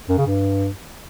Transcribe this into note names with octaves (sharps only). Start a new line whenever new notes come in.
F#2
C#3
G2